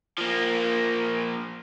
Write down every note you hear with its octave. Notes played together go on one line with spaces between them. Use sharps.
F3 A#3